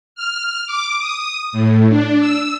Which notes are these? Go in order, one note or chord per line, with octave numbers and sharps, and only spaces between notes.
F6
D6
D#6
A2
D4
E6